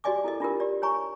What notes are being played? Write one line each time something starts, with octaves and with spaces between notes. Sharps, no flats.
F#4 G4 D5 D#5 G#5 D6
E4 A4 A#4 D#5
D4 F4 G4 A#4
G4 D5
C#5 G#5 A#5 C#6